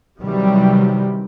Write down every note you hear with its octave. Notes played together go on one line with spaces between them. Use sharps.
C3 D#3 E3 F#3 G3